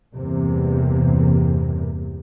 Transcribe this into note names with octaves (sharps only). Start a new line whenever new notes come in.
E2 G2 C3 A#3